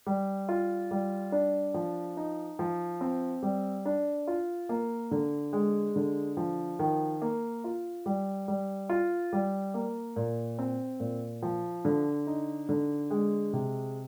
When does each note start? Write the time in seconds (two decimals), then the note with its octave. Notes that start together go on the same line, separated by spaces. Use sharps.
0.07 G3
0.49 F4
0.91 G3
1.32 D4
1.74 F3
2.17 D#4
2.59 F3
3.01 C4
3.43 G3
3.85 D4
4.27 F4
4.69 A#3
5.11 D3
5.53 G#3
5.96 D3
6.37 F3
6.79 D#3
7.22 A#3
7.64 F4
8.06 G3
8.48 G3
8.89 F4
9.33 G3
9.74 A#3
10.16 A#2
10.59 C4
11.00 A#2
11.43 F3
11.85 D3
12.27 D#4
12.69 D3
13.11 G#3
13.53 C3